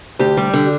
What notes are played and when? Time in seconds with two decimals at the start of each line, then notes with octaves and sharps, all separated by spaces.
0.19 D2 G4
0.37 G3
0.53 D3